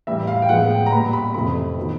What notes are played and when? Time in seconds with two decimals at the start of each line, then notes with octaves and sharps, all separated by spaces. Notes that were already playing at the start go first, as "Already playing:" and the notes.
0.07 A2 E3 G3 E5
0.27 F5
0.42 G5
0.49 A2 F3 G#3 B3 F#5
0.70 G5
0.86 A#5
0.92 A#2 G3 B3 B5
1.13 B5
1.34 F2 C3 E3 A3 B5
1.77 D#3 F#3 B3